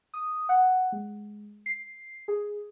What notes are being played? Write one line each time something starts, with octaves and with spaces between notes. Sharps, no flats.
D#6
F#5
G#3
C7
G#4